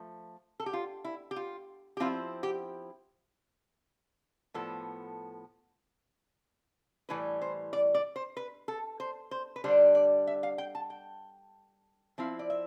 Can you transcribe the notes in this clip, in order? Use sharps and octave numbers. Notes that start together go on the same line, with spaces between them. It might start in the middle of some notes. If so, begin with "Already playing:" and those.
Already playing: F3 A3
A4
G4
F4
E4
G4
F4
G4
F3 C4 E4 F4
G4
A2 F3 B3 A4
A2 E3 G3 B4
C5
D5
D5
C5
B4
A4
C5
C5
B4
D3 G3 D4 C5
D5
E5
F5
G5
A5
G5
F3 C4 E4 F5
D5
E5